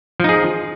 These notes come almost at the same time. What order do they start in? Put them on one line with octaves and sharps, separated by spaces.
F3 D#4 G#4